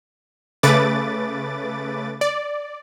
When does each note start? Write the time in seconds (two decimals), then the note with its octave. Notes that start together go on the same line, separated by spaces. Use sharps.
0.63 C#3 A3 B4 D6 A6
2.21 D5